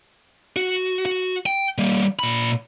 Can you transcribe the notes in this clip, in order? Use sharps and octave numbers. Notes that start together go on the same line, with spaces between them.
F#4
F#4
G5
G3 A#3
A#2 B5